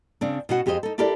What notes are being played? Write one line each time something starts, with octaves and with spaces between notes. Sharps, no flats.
C#3 C4 D4
B2 B3 C#4 F#4 F#5
F2 G4 G#4 C5 D#5
D#4 A4
D4 E4 G4 A4 A#4 D5